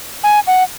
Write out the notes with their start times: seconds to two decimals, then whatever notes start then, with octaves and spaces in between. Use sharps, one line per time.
0.24 G#5
0.47 F#5